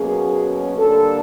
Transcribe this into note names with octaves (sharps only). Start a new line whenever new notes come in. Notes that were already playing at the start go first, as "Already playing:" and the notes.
Already playing: B2 F#3 A#3 C#4 G#4
D3 G3 A#3 A4